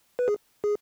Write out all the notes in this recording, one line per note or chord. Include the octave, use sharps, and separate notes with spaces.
B4
G#4
G#4